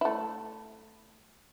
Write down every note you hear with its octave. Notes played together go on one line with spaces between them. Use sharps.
A3 E4